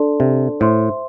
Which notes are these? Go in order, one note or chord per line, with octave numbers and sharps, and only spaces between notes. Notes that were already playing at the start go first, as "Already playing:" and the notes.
Already playing: D4 A4 D5 A5 C6
C3
A2 C5 E5 C6